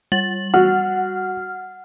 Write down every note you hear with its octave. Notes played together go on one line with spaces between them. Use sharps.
G3 A6 F#7
F#4 F#5 F6